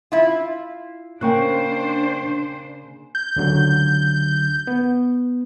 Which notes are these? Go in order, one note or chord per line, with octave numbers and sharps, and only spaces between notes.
E4 F4
C#3 A#3 D4 C5 G5 C#6 F#6
G6
C#2 D3 F#3
B3